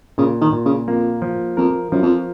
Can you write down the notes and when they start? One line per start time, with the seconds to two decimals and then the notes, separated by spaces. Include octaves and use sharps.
0.18 A#2 C#3
0.41 D#3
0.53 A#2
0.65 C#3
0.87 F2 A#3
1.22 F3
1.57 F2 A#4
1.92 F#2 F3
2.03 F2